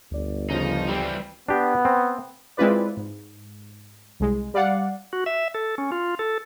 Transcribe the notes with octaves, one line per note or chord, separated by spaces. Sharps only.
G1 D2 D5
C#3 F3 D#4
E3 G3 C4
B3 D4 G4
C4
G#3 C4 E4 F4 B4 D5
G#2
C2 G#3
G3 D5 F5 F#5
F#4
E5
A4
C#4
F4
A4